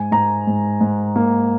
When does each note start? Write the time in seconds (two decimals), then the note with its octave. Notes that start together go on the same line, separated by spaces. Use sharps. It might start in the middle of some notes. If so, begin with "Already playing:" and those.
Already playing: G#2 G#5
0.11 G#2 A#5
0.47 G#2
0.81 G#2
1.16 A#3